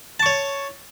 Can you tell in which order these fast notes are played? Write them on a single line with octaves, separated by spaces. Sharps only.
A5 C#6 C#5